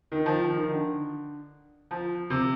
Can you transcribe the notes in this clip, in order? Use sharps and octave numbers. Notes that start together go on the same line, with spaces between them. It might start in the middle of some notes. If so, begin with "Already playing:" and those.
D#3
F3
D#3
D#3
D3
F3
C3